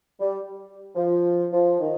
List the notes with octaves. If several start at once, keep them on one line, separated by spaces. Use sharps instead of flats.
G3
F3
F3
D#3